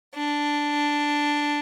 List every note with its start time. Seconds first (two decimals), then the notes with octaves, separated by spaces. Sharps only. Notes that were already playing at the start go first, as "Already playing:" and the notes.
0.14 D4